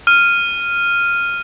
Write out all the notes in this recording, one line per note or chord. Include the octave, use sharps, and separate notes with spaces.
F6 D#7